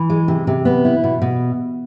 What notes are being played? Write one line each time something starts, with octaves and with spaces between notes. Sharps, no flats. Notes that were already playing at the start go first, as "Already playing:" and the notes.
Already playing: E3
G#3
C3
C3
B3
E4
B2
B2